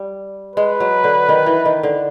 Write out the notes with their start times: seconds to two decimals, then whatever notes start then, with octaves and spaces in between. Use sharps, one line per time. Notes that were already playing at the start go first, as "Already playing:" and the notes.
Already playing: G3
0.56 G#3 B4
0.80 F#3
1.04 D3
1.29 D#3
1.46 E3
1.65 D#3
1.83 D3